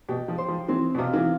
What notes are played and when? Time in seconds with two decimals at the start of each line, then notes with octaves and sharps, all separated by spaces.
0.09 B2 G4
0.28 F3
0.38 C5
0.48 F3
0.68 E3 C4
0.95 B2
0.98 C3 F5
1.14 E3